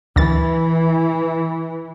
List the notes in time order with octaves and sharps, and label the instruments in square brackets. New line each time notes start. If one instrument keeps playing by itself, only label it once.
[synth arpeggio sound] D2 A6 [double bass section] E3